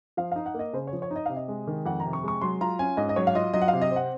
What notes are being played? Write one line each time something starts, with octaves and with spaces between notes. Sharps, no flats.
F3 F5
D#4 F5
F#5
A#3 D#5
C#3 C5
C#5
F3
C#5
D#4
D#5
C3 F5
D#5
G#3
D#3
F2 F#5
A#5
C3
C#6
G#3 C#6
F#3 C6
F4 A#5
C#4 G#5
G#2 D#5
D#5
F#3 C#5
F5
F4 D#5
F#3 D#5
F#5
F5
C3
D#5
C4
F#5